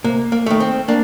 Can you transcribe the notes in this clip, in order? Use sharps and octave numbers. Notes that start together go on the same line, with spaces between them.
C3 A#3
A#3
D#3 A3
C4
A#3 D4